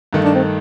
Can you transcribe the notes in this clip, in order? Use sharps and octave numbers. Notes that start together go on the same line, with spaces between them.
G2 D#3 A3
D4
C4